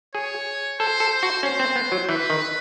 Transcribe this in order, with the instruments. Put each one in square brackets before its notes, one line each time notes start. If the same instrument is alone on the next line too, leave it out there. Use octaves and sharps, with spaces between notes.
[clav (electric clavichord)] G#4 [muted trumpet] C#5
[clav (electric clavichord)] A4 [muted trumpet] C5
[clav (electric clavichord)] A4
[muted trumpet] C5
[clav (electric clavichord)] F#4
[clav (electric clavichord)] C#4 [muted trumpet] C5
[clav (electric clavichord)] C4
B3
F#3
[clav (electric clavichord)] E3 [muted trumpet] B4
[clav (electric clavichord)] D#3